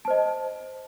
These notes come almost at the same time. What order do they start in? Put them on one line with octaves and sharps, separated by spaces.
A5 C5 D#5